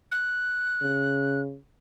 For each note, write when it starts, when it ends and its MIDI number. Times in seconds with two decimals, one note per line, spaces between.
0.12 1.40 90
0.81 1.58 49